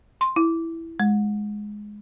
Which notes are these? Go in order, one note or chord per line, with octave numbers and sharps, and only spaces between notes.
C6
E4
G#3